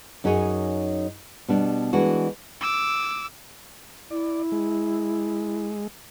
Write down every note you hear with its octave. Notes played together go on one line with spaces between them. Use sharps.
F#2 D#4 F#4 G#4 C#5 G#5
B2 G3 D4
E3 G#3 D4 F#4
D6 E6
E4 D5
G#3